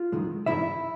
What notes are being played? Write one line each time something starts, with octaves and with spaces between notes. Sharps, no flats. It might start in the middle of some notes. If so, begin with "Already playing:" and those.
Already playing: F4
F#2 D#3 G#3
G2 E3 G3 C4 D#4 E4 E5